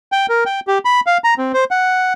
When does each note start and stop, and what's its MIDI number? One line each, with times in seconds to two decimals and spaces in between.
0.12 0.26 79
0.29 0.44 70
0.46 0.60 79
0.67 0.78 67
0.85 1.00 83
1.06 1.18 77
1.24 1.34 82
1.38 1.52 60
1.54 1.64 72
1.71 2.13 78